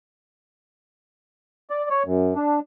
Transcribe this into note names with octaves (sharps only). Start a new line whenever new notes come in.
D5
C#5
F#2
D4